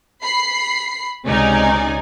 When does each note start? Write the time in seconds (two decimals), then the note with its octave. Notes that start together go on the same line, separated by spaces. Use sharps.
0.21 B5 C7
1.24 C#2 C3 C#4 D#4 D5 G#5